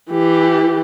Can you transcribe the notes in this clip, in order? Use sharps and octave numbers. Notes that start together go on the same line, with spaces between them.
E3 G4